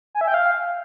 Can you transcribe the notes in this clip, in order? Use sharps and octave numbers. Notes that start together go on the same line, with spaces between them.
G#5
E5
G5
F5